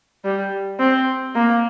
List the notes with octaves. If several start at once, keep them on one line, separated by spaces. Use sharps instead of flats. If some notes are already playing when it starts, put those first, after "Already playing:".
G3
C4
A#3